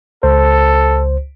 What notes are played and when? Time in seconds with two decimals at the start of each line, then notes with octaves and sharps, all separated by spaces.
0.23 C#2 A4 C5